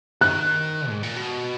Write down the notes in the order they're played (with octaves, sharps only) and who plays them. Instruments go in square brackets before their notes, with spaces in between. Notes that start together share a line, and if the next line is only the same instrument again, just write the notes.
[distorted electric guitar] D#3 [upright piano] F#6
[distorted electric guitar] G#2
A#2
B2